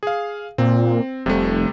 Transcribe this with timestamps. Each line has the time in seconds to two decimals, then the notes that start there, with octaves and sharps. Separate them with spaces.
0.03 G#4 F5
0.58 A#2 C4
1.26 F1 C3 G3 A3